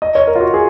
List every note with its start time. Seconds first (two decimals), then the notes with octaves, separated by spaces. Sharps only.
0.02 D#5
0.15 C#5
0.27 A#4
0.35 F4
0.40 F#4
0.54 G#4